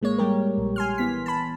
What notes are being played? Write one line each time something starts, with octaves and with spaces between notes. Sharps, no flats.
A1 G#3 A#3 C#5
G3 G#3 G4 A#4
A#1
G#5 C6 F6
E3 B3 B6
A5 B5